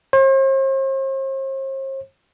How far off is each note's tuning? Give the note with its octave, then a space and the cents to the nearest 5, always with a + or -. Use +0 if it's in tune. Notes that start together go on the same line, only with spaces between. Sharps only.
C5 +45